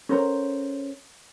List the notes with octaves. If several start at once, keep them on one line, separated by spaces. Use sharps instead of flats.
C#4 A4 A#4 C5 F#5 A#5